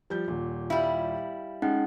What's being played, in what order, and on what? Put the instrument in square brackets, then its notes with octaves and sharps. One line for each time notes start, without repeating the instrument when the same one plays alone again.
[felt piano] F3 G3 G6
D#1 A#2
[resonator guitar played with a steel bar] G3 E4 [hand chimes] F5
[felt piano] G#3 [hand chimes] C#4 D#4 F#5